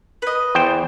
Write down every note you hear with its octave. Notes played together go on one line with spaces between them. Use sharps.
B4 D#5
E2 C5 G5